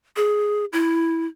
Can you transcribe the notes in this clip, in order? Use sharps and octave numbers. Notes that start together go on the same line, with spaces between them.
G#4
E4